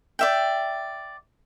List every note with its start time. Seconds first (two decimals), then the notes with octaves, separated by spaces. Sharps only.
0.19 D5 E5 G5